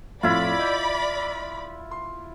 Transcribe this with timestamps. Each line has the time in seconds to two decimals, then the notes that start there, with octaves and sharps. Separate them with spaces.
0.23 F2 A2 E4 F4 D5 B5
0.59 D#5 G6
1.91 C6